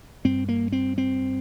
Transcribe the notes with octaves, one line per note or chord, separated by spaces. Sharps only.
G2 C4
A#3
C4
C4